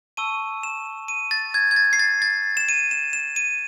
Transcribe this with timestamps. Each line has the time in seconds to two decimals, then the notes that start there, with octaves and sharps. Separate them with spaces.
0.17 A5 C#6 E6 D#7
0.63 E7
1.08 D#7
1.31 A6
1.54 G#6
1.71 G#6
1.76 A6
1.93 C7
1.99 A6
2.22 A6
2.57 E7
2.69 D#7
2.91 E7
3.13 E7
3.36 D#7